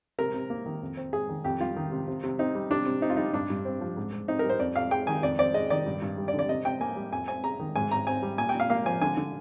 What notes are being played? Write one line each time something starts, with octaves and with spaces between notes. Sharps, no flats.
C3 A#4
C3
A#3
D#3
F2
C4
G#3 G#4
D#3
F2 G4
G3 F4
D#3
C3
C3
C3
C4 D#4
G3
C3 D4
C3
C4 D#4
F4
G3 D#4
G2 D4
G2
C4
F3
G#2
G#2
C4 D#4
G3 A#4
C5
F2 D5
F2 F5
G#3 G5
D#3 G#5
F2 D5
C4 D5
G#3 D#5
D#3 D5
G2
G2
G3
D5
D3
D5
C3 D#5
C3 G5
A#3 G#5
G3
F2 G#5
C4 G#5
G#3 A#5
D#3
G#2 G#5
G#2 A#5
C4 G#5
G3
A#2 G#5
G5
A#2
F5
A#3 F5
F3 G#5
D3 G#5
D3